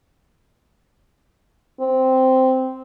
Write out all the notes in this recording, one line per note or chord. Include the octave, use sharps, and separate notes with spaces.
C4